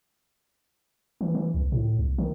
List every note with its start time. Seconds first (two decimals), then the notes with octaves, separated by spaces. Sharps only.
1.21 E3
1.35 E3
1.54 C2
1.72 A2
1.99 C2
2.18 D#3